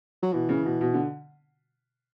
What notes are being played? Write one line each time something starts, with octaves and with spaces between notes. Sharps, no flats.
F#3
B2 E3
C#3
B2
B2
D3